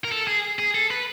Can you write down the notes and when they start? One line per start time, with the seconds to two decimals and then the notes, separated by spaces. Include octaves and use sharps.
0.04 A#4
0.12 A4
0.27 G#4
0.59 G#4
0.75 A4
0.91 B4